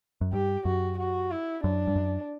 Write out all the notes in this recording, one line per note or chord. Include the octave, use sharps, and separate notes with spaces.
F#2
G2 G4
F#2 F#4
F#4
E4
F#2 D4
G2
F#2